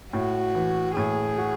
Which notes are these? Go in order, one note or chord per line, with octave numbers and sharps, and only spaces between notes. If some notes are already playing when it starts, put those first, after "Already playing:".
A2 F#4
E3
A2 G#4
F#4